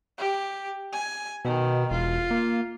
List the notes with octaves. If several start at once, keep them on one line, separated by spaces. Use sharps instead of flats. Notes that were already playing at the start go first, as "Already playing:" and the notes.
G4
G#5
B2 D#3
E1 F4
A#3